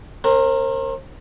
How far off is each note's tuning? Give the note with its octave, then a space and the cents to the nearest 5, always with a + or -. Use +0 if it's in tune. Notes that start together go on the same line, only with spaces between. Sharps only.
C4 +40 A#4 -10